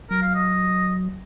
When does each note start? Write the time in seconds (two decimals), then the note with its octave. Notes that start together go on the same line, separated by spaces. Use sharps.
0.10 F#3 A#4
0.22 F5
0.34 D#5